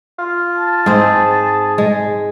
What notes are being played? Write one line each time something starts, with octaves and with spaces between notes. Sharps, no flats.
F4
A5
G#2 C4 G#4
G#3